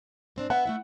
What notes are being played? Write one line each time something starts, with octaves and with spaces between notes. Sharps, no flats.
G#2 C4 D4
B3 E5 F#5
A3 E4 E5